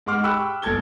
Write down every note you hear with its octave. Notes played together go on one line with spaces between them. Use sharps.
G#2 G#3 F#5 C6 D6 F6
G4 G5 B5 C#6 E6 F#6
G1 A4 A5 G#6 G7